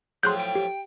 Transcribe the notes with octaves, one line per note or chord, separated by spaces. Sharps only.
A2 F3 F#3 G#4 C6 F#6 G6
G5
G4